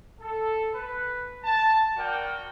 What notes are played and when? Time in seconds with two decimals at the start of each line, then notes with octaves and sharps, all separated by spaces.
0.21 A4
0.74 B4
1.44 A5
1.98 F#4 A#4 D5 G5